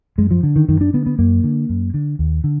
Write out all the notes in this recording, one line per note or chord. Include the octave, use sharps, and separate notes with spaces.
F#2 G#3
F3
D3
D#3
F#2 D#3
D4
D3 B3
B3
F#2 A#3
D3
F#2
D3
D#2
D3